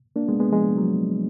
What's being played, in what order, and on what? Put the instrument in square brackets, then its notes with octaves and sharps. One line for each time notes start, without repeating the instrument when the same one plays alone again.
[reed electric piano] A#3 D4
G#3 B3
G#3 B3
F3 G#3
F#3